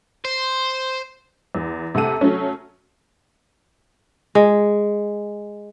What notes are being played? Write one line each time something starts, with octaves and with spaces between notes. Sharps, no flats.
C5
E2
C3 A3 A4 F#5 D#7
F#3 A3 C#4
G#3